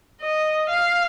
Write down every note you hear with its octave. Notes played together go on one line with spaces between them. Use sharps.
D#5
F5